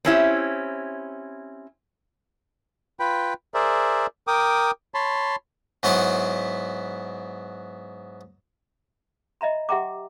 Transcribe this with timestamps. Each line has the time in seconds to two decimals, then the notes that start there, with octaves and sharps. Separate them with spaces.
0.05 C4 C#4 E4 G4
3.00 F4 B4 G5 B5
3.54 G#4 A#4 C5 D5 E5
4.27 A#4 G5 D6 D#6
4.94 C#5 A5 B5 C6
5.83 G#2 F#3 B3 E4 F#5
9.41 D#5 E5 A#5 B5
9.69 G4 E5 F#5 G5 A#5 D6